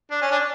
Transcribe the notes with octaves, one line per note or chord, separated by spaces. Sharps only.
D4
C#4
D4